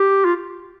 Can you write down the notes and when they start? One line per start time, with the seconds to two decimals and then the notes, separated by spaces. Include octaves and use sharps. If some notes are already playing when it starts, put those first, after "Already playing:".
Already playing: G4
0.25 F4